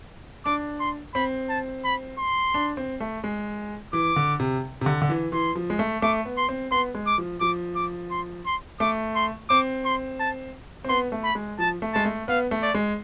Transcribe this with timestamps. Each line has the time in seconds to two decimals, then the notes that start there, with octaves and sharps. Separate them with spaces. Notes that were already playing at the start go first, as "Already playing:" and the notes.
0.45 D4 D6
0.80 C6
1.14 C4 B5
1.49 A5
1.85 B5
2.19 C6
2.54 D4
2.77 C4
3.01 A3
3.24 G#3
3.93 E3 D6
4.16 D3
4.40 C3
4.81 C3
4.86 D3
5.02 D3
5.09 E3
5.32 E3 C6
5.56 F3
5.70 G#3
5.79 A3
6.02 A3 D6
6.25 B3
6.37 C6
6.49 C4
6.71 B3 C6
6.95 G#3
7.06 D6
7.18 F3
7.41 F3 D6
7.76 D6
8.11 C6
8.46 C6
8.80 A3 D6
9.16 C6
9.49 C4 D6
9.85 C6
10.20 A5
10.84 C4
10.89 B3 C6
11.12 A3
11.24 B5
11.35 G#3
11.59 F3 A5
11.82 A3
11.94 G#3 A5
12.05 A3
12.28 B3 F5
12.51 A3
12.63 D5
12.75 G#3